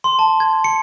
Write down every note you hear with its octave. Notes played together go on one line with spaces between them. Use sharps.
C6
A5
G#6
C#7